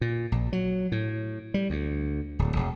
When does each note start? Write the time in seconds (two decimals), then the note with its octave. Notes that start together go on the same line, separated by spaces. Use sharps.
0.01 A#2
0.32 A#1
0.53 F#3
0.92 A2
1.54 G3
1.70 D2
2.39 D1
2.56 E1